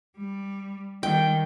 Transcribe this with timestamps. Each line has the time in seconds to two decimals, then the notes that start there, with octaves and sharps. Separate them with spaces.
0.17 G3
1.03 D#3 G3 G5